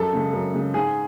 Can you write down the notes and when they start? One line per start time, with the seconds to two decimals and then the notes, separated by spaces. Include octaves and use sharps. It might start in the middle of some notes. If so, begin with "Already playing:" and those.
Already playing: F#2 A4
0.13 C#3 G#3
0.33 F#2
0.53 C#3 G#3
0.74 G#2 G#4